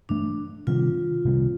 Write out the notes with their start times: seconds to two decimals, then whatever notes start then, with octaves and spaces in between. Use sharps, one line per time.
0.09 G2 E3 A3 D4
0.67 C3 D#3 G3 C4 F4
1.25 C3 D#3 G3 C4